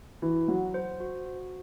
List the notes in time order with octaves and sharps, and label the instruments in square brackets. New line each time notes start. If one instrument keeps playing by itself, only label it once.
[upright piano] E3 [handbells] F#4
[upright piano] F#3 [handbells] F#5
[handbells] C5
F#4
F#4